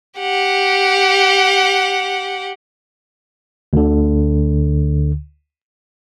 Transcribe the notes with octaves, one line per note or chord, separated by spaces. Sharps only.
G4 F#5
D2 D3